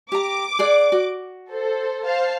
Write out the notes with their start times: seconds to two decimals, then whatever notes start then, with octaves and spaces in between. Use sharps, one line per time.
0.12 G4 A#5 D6
0.59 G#4 D5 F#5
0.92 F#4
1.50 A4 C5
2.05 C5 F5 A5